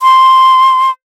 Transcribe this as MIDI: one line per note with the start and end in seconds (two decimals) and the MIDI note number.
0.01 0.90 84